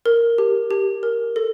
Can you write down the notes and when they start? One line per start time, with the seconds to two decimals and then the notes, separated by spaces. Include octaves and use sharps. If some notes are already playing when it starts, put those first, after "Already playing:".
0.06 A#4
0.38 G4
0.71 G4
1.03 A#4
1.36 A4